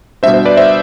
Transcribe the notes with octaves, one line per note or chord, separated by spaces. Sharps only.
B2 G3 D4 C5 E5
C5
B4 D5
C5 E5